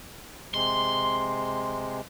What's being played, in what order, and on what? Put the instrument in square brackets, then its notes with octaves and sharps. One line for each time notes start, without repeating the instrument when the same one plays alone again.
[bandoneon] C3 G#3 [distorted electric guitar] C6